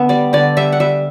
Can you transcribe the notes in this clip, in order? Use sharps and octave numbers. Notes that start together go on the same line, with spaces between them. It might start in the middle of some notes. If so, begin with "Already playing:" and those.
Already playing: D3 B3 E5
G3 D5
D3 D5
G3 E5
F#5
G3 E5